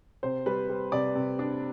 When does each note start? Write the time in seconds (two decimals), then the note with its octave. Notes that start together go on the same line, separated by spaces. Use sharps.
0.23 C3 C5
0.46 G3 B4
0.69 G3
0.92 C3 D5
1.15 C3
1.39 D4